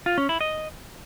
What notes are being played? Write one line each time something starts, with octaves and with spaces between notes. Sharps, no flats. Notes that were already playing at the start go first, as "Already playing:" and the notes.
F4
C#4
E4
D#5